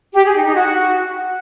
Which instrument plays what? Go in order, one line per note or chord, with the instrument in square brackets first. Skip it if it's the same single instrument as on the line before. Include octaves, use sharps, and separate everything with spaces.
[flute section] G4
G#4
D#4
D#4
F#4